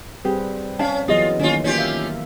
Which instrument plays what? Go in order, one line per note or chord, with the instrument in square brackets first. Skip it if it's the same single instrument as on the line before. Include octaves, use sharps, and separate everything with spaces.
[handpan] G3 C4 B4 [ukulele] G4 G#4
[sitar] C#4 [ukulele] F5 A5
[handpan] E3 F#3 B3 [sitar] F4 [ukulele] G#4 D#5
[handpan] D#3 A#3 [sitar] C#4 F4
[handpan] A#3 [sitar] C#4 F4 G4
[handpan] E5 F5